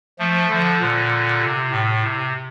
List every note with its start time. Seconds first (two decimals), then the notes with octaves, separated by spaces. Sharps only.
0.18 F3 A3
0.49 D3 F3
0.79 A#2 D3
1.41 C3
1.71 A2
2.01 C3